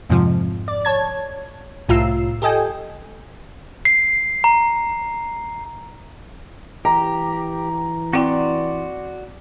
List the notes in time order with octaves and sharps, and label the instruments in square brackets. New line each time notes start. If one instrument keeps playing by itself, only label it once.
[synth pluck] F2 G#2 C3 F3
D5
C#5 A5 G#6
C2 A2 F4 A#5 E6 C7
G4 A4 D#5 G5 G#5
[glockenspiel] C7
A#5
[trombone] E3 [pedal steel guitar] G4 [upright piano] A#5
[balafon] C4 E4 G5 [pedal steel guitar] F#4 D5 C6